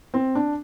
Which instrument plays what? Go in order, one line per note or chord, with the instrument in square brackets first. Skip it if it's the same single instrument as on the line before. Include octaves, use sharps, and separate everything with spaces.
[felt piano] C4
D4